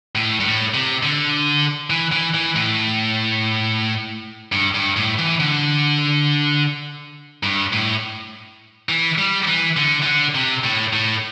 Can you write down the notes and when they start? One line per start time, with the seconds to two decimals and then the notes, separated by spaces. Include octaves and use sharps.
0.15 A2
0.40 G2
0.45 A2
0.74 C3
1.03 D3
1.90 E3
2.12 E3
2.34 E3
2.56 A2
4.52 G2
4.75 G2
4.97 A2
5.19 E3
5.40 D3
7.43 G2
7.73 A2
8.89 E3
9.18 G3
9.48 E3
9.77 D3
10.02 E3
10.06 D3
10.35 C3
10.64 A2
10.93 A2